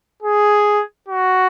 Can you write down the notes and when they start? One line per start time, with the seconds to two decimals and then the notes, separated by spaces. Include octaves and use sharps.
0.23 G#4
1.08 F#4